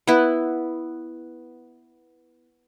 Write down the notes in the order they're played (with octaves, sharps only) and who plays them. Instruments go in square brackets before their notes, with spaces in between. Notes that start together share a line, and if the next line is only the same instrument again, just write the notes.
[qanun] B3 E4